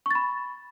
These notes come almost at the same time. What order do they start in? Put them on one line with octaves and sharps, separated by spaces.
C#6 A6 B5